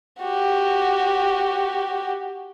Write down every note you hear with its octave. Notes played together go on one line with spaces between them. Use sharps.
F#4 G4